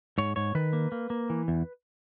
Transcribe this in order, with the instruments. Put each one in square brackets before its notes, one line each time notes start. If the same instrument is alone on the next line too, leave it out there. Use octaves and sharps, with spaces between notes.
[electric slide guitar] G#2 C#5
G#2 C#5
D#3 B4
A#3
A#3
A#3
E3
E2